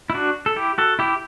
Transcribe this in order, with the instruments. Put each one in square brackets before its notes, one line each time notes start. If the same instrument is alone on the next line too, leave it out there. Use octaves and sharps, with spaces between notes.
[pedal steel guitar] E4
D4 F#4
A4
E4 G4
F#4 A4
E4 G4